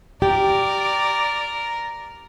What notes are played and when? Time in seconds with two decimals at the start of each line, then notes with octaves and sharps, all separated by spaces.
0.22 G4 A#4 D5